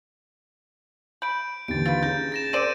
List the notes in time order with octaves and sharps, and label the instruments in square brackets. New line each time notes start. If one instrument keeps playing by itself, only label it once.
[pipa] B5 [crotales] G6 D7
[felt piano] D#2 D3 E3 [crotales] A6 D7
[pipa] F4 B4 [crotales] A6
[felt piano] C#4 G#4 [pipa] D#4 [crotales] G6
[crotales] A6 A#6 E7
[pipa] C4 C5 D5 [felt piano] A#4 [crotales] D7 D#7